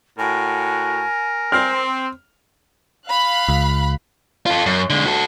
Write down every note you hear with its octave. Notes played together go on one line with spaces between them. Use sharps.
A2 F#4 A#4 G#5
C4 F6
F5 B5 F#6
C#2
F4 A4
F#2
D3 G#3
F#4 A4